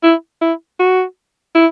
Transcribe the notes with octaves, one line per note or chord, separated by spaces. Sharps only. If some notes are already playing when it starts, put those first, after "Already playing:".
E4
E4
F#4
E4